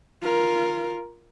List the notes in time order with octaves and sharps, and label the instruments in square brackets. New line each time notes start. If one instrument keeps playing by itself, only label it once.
[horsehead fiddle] F4 A#4